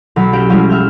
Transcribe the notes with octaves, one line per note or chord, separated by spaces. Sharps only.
B1 F#3 B5
C#4 F#4 G4 F#5 D7
F3 G3 G#3 C#4 E4 F#4
E5 F6 G6